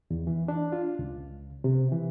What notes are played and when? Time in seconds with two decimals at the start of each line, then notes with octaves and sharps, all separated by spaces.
0.10 E2
0.27 E3
0.48 D4
0.72 F4
0.99 C#2
1.64 C3
1.92 E3